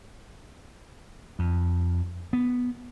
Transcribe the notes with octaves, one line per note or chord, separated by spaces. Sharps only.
F2
B3